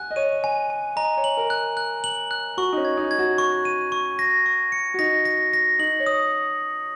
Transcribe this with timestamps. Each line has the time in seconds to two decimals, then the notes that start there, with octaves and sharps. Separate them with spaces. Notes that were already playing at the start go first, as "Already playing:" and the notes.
Already playing: F#5 G#5 F#6
0.11 D#5
0.16 C#5 D#7
0.44 G#5
0.70 G#5
0.96 D#5 A#5
1.17 C#5
1.24 F#7
1.37 A#4
1.50 F#6
1.77 F#6
2.04 F#7
2.31 F#6
2.57 F#4 C#6
2.73 D#4
2.78 C#4
2.85 G#6
2.97 D#4
3.11 G#6
3.19 F#4
3.38 C#6
3.65 D#7
3.92 C#6
4.19 A#6
4.46 C#6
4.72 C#7
4.94 F#4
4.99 D#4 A#6
5.25 A#6
5.53 A#6
5.79 D#4 F#7
6.00 C#5
6.06 D#6